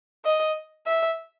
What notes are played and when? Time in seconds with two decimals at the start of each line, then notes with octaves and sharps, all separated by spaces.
0.25 D#5
0.87 E5